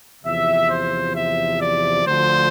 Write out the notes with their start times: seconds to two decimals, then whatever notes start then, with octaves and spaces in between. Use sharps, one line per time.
0.24 E2 C3 F3 E5
0.70 C5
1.16 E5
1.60 D5
2.05 D2 D3 F3 C5